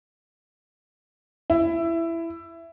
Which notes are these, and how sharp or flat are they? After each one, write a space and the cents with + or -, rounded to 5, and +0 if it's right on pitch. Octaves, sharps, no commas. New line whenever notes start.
E4 +15